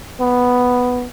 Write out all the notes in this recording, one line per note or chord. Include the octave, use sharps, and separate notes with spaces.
B3